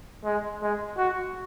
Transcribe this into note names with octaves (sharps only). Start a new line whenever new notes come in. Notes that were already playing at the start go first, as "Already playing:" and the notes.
G#3
G#3
F#4